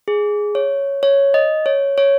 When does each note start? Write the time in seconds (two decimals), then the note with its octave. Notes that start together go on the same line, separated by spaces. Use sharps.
0.08 G#4
0.55 C#5
1.03 C#5
1.34 D#5
1.66 C#5
1.98 C#5